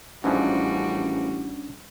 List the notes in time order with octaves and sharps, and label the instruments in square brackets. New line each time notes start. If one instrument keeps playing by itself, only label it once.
[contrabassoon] A1 [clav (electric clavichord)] G#2 E3 F3 [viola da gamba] G3 F#4 [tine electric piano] C#4 D4